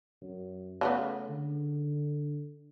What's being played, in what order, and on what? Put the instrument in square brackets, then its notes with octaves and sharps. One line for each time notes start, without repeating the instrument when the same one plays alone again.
[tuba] F#2
[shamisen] C#3 F#3 B3 [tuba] A3
[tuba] D3